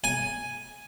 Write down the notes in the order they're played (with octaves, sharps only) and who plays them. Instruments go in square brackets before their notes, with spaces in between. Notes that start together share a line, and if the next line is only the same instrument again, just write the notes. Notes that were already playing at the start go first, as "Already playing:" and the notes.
[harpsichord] G#5